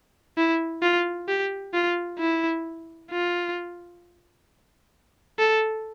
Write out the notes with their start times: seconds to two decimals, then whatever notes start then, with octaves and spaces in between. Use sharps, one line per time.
0.37 E4
0.82 F4
1.28 G4
1.74 F4
2.19 E4
3.11 F4
5.39 A4